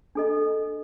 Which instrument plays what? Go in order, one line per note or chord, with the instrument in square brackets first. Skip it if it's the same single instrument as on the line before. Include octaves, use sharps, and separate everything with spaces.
[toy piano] D4 A4 D#5